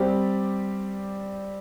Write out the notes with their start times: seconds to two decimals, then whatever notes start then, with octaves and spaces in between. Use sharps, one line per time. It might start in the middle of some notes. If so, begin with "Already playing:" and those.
Already playing: G3 C4 G4 D5